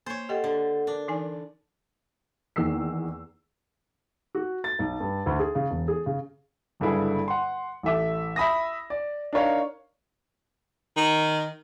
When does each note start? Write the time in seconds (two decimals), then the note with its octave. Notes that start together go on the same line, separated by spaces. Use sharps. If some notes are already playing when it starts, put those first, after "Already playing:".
0.06 A#3 C5 C#5
0.29 G4 A4 D#5 F#5 G5
0.44 D3
0.87 D4 A#4
1.08 E3 D#4 G#5
2.56 E2 D#3 A#3 E6 C7
4.35 F#4
4.64 A6
4.79 B1
5.00 G2
5.26 D2
5.39 G#4
5.55 C#3
5.70 E1
5.88 G#4
6.06 C#3
6.80 F#1 G2 D3 E4 G#4
7.28 F#5 C6
7.83 A1 A4 E5 D6
8.36 E5 B5 D#6 A#6
8.90 D5
9.33 D4 D#4 A#4 C#5 F5
10.96 D#3